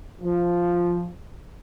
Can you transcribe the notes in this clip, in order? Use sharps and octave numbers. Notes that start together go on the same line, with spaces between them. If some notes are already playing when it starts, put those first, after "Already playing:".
F3